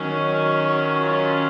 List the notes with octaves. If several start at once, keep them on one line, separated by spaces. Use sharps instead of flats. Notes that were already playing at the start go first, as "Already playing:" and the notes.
Already playing: D#3 F#3 C#4
F4